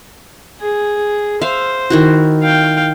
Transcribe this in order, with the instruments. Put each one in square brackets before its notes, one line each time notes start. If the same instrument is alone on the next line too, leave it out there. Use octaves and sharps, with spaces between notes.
[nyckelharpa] G#4
[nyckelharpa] C5 [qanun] E5 F5
[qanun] D#3 E4 F#4
[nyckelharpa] F5 G5